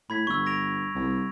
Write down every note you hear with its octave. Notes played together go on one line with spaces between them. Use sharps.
A2 B5 G#6 B6
G1 C#6 E6
A#6 D7 F7
C2